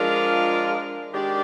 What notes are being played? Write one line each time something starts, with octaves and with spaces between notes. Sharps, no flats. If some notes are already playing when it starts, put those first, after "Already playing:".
Already playing: F3 G#3 D4 F4 A#4
D#3 G#3 D4 G4 D5